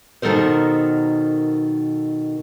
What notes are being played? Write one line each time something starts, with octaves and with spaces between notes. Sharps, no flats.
B2 D#3 C4 A4 A#4 C5